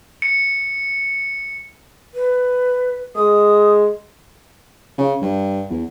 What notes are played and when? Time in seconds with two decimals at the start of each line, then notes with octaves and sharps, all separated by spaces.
0.22 C#7
2.14 B4
3.16 G#3 D#6
4.98 C#3
5.22 G2
5.70 E2